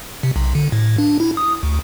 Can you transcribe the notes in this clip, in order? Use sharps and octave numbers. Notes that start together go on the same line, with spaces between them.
C3
B1
D3
A2
D4
E4
D#6
D2